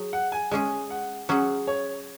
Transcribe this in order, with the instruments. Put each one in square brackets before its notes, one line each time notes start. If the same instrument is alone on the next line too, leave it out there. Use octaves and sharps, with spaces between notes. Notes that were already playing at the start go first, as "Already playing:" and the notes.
Already playing: [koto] F#3 G#4
[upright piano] F#5
G#5
[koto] G#3 C#4 G#4 [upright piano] G#5
[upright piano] F#5
[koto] F#3 C#4 G#4 [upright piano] F#5
[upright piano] C#5